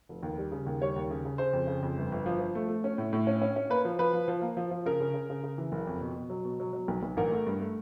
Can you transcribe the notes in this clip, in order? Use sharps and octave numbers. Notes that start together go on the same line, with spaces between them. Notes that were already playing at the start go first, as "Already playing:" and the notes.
F1
D#2
G3
C#3
D#2
G3 C#5
D#2
C#3
C#3
C#3 C5
F2
C#3
F2
G1
G1
F3
F3
A3
A3
C#4
A2
A2
C#4
C#4
C#4
A#3 B4
F3
F3 B4
F3
F3
A#3
F3
F3
C#3 A#4
C#3
C#3
C#3
C#3
E3
F#1
F2
B2
B2
F#3
B2
F#3
F#3
B1
B1
A1 A#4
A3
G2
A3